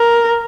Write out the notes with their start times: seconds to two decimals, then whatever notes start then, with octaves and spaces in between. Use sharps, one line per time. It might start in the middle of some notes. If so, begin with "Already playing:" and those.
Already playing: A#4